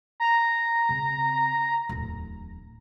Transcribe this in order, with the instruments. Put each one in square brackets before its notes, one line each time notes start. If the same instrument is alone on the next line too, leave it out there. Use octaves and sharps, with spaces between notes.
[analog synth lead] A#5
[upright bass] C#3 C4
D1 E2